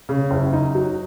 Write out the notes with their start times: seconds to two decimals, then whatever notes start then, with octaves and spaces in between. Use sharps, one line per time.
0.09 C#3
0.31 F#1
0.53 D#4
0.75 F#3